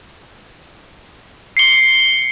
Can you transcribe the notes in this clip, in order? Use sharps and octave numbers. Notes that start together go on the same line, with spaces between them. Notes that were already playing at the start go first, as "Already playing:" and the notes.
C7 C#7 G7